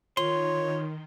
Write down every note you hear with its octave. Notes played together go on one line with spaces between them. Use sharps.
D#3 F4 C#5 C6